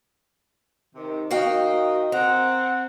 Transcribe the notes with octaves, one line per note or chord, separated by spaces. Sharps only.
C3 D#3
D#3 F#4 A#4 D#5 F5 G5
C4 F#5 A#5